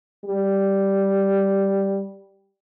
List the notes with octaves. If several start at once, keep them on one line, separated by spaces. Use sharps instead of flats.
G3